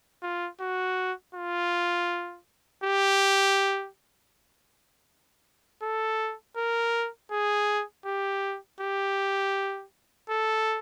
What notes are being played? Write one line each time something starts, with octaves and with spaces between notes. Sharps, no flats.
F4
F#4
F4
G4
A4
A#4
G#4
G4
G4
A4